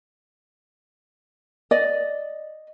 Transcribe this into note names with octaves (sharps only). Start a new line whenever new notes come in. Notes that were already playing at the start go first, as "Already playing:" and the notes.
D5 D#5